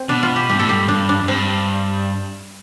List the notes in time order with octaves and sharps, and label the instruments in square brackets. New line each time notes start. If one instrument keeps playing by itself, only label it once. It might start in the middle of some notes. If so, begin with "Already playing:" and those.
Already playing: [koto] C4
[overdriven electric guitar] B2 [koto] D4
[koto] F4
G4
[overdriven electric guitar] G2 [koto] G4
[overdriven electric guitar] A2 [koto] A4
[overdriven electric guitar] G2 [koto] G4
[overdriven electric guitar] G2 [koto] D4
[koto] D4
[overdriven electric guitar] F2
[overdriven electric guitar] G2 [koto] C4